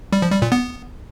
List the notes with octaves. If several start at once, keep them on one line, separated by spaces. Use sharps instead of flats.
G3
F3
G3
A#2
B3